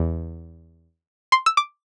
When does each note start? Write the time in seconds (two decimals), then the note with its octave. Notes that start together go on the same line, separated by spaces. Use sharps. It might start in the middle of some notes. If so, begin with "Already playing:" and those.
Already playing: E2
1.32 C6
1.46 E6
1.57 D6